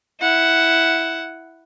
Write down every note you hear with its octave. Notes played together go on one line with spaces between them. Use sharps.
E4 F#5